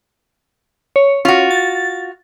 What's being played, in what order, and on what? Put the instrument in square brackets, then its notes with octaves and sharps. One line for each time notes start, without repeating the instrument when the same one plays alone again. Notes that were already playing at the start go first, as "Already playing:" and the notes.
[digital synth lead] C#5
[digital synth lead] C#4 [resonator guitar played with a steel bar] F4 F#4
[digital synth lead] A6